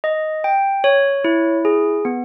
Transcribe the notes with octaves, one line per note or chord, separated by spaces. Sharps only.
D#5
G5
C#5
E4
G#4
B3